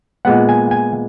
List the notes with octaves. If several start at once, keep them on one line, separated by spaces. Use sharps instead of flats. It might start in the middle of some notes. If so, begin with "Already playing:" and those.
A#2 G#3 B3 F#5
G#5
G#5